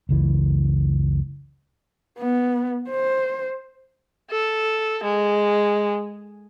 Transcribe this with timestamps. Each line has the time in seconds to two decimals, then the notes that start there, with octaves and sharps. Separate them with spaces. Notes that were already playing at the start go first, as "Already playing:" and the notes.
0.09 F#1 C#2 E3
2.19 B3
2.90 C5
4.31 A4
5.04 G#3